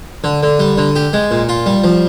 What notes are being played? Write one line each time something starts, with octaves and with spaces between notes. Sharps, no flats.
D3
D3
G3
D3
G4
G#3
A#2
F4
G3
F3